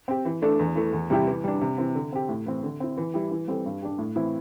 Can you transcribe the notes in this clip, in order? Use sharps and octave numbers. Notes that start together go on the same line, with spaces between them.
C4 G4
E3
A3 D4 A4
E2
E3 A3
E2
C3 G3 E4 G4
E3
G3 D4
C3
E3 C4
D3
C4 G4
A2
E3 C4
D3
C4 E4
E3
G3 E4 G4
E3
G3 C4 A4
G2
G3 D4 G4
A2
E3 C4 E4